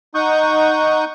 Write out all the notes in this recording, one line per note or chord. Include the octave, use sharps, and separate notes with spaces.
D#4 F#5 C#6 D#6 G6